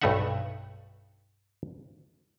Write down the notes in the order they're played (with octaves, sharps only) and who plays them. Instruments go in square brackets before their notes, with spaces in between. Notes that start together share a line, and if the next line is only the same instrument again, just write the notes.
[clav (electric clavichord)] B1 G2 A3 D#4 E5 F#5